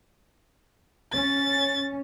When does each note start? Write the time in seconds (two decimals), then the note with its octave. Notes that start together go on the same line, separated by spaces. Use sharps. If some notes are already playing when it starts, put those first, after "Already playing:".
1.13 C#4 A6